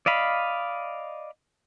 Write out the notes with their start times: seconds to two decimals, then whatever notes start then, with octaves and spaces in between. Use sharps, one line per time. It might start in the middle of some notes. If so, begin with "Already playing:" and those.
0.06 D5 D#5 F5 B5